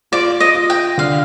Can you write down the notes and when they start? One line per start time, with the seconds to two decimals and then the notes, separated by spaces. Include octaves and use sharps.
0.12 F4 D5
0.40 D#5
0.55 F4
0.70 G5
0.98 D3 F5